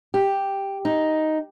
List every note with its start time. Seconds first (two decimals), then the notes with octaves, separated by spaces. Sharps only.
0.14 G4
0.85 D#4